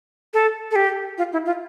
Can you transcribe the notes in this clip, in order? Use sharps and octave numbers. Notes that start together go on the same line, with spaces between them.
A4
A4
G4
F4
E4
F4